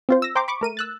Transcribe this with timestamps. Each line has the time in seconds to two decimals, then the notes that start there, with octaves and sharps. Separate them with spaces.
0.09 C4 F4 C5
0.22 E6 A#6
0.35 C5 G5 A#5 C6 D6
0.48 B5 C#6 D6
0.61 A3 A#4 D#7
0.77 E6 F#6 A6